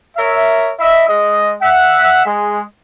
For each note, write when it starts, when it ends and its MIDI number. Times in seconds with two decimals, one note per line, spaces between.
0.16 0.71 70
0.16 0.71 73
0.16 0.71 76
0.79 1.05 64
0.79 1.05 75
0.79 1.05 76
1.08 1.54 56
1.08 1.54 75
1.62 2.24 76
1.62 2.24 78
2.25 2.60 56